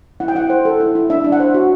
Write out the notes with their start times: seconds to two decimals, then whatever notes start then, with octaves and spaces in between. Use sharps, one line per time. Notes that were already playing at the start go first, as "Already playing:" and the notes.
0.20 E4 F#5
0.28 G5
0.35 E4 F#5
0.50 C5
0.65 A4
0.80 E4
0.95 E4
1.10 D4 E5
1.24 D4
1.32 F#5
1.40 C5
1.54 F#4